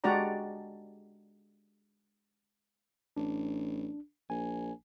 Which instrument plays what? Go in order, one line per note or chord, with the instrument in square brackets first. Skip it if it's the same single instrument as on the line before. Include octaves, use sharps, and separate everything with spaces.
[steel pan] G#3 D4 F#4 G4 D5 A#5
[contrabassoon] A1 [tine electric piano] D4
[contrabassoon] A#1 [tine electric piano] G#5